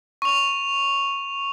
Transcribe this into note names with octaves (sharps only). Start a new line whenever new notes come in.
C#6 F7